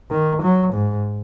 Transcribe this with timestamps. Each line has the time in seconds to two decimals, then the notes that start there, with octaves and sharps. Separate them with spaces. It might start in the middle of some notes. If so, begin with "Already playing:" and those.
0.11 D#3
0.42 F#3
0.73 G#2